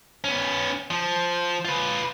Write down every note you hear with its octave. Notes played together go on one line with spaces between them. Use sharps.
B3 C#4
F3
F4 B4